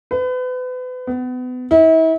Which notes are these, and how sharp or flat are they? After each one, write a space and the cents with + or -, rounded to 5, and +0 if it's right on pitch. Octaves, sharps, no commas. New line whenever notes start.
B4 +35
B3 +30
E4 -40